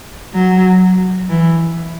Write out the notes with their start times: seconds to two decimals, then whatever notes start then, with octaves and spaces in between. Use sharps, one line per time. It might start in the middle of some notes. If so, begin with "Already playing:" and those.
0.34 F#3
1.30 E3